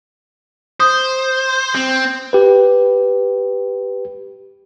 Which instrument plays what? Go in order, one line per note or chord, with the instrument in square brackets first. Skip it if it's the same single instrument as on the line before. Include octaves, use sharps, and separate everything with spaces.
[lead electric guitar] C5 [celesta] D#6
[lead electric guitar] C4
[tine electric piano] G4 B4